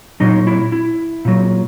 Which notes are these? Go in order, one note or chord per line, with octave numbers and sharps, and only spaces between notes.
A#2 F#3 D#4
E4
E4
A#2 F#3